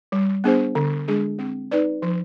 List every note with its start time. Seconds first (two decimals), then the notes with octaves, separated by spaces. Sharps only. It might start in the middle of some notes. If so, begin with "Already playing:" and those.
0.12 G3
0.44 B3 D4 G#4 C5
0.75 D3
1.08 G#3 D4 G#4
1.39 C4
1.71 D#4 B4 D5
2.02 F3